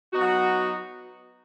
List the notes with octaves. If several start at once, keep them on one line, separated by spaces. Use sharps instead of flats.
F#3 B3 D#4 F#4